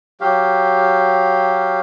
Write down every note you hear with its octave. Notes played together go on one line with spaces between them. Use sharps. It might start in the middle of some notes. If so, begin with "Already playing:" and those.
F#3 G4 F5